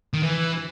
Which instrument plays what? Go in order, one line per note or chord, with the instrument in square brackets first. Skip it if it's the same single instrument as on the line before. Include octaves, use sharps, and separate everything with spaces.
[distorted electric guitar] D#3
E3